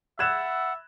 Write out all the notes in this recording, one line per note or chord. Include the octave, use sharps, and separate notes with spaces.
E5 F#5 B5 E6 F#6 G#6 A6 E7